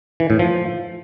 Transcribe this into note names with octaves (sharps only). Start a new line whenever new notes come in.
E3
A2
F3